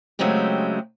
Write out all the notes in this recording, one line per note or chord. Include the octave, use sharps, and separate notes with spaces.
C#3 F#3 G#3 A3 C4 G4